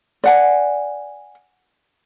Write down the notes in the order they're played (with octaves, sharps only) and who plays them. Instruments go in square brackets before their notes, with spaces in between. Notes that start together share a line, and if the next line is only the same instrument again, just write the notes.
[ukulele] D5 F#5 G#5